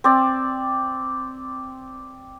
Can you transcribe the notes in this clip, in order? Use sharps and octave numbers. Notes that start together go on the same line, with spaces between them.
C4 D5